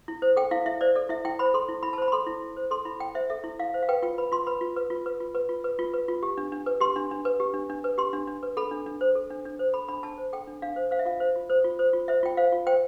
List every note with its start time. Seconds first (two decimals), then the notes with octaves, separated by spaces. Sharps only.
0.08 E4
0.22 C5
0.37 A4 G5
0.51 E4 F5
0.66 E4 E5
0.81 C5 D5
0.95 A4 D5
1.09 E4 E5
1.25 E4 G5
1.39 C5 B5
1.54 A4 C6
1.69 E4
1.83 E4 B5
1.93 A5
1.98 C5 B5
2.08 B5
2.12 A4 C6
2.27 E4
2.42 E4
2.57 C5
2.71 A4 C6
2.85 E4 B5
3.00 E4 G5
3.15 C5 E5
3.30 A4 E5
3.44 E4
3.59 E4 F5
3.74 C5
3.83 F5
3.89 B4 G5
4.02 F4 G5
4.18 B4 B5
4.32 F4 C6
4.47 B4 B5
4.61 F4
4.77 B4
4.90 F4
5.06 B4
5.20 F4
5.35 B4
5.49 F4
5.64 B4
5.79 F4
5.94 B4
6.08 F4
6.23 G4
6.37 D4
6.52 D4
6.66 B4
6.81 G4 C6
6.96 D4
7.11 D4
7.25 B4
7.40 G4
7.54 D4
7.70 D4
7.84 B4
7.98 G4 C6
8.13 D4
8.28 D4
8.43 B4
8.57 A4 B5
8.71 D4
8.86 D4
9.01 C5
9.15 A4
9.30 D4
9.45 D4
9.59 C5
9.74 A4 B5
9.88 D4 B5
10.03 D4 A5
10.18 C5
10.33 A4 G5
10.48 D4
10.62 D4 F5
10.76 C5
10.91 C5 F5
10.99 E5
11.05 F4 F5
11.20 C5
11.35 F4
11.50 C5
11.64 F4
11.79 C5
11.93 F4
12.08 C5 E5
12.23 F4 G5
12.37 C5 F5
12.52 F4
12.66 C5 G5